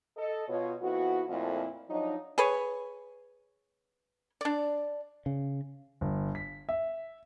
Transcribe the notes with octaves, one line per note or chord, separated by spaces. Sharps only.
A4 D#5
B2 F4 C#5
F2 B3 E4 F#4
F2 A#2 A3 C4 E4 F4
F3 F#3 D4 D#4
G#4 B4 C#5
D4 D5
C#3
G1
B6
E5